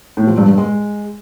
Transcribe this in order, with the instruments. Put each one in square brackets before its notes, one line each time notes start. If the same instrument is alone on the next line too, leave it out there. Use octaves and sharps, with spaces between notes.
[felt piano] A2
F3
G2
G2
G#3